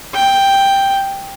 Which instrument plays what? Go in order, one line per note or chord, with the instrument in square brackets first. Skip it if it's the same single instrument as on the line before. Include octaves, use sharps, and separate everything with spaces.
[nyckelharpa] G5